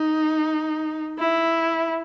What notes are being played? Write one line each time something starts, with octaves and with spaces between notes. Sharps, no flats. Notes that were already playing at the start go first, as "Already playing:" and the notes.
Already playing: D#4
E4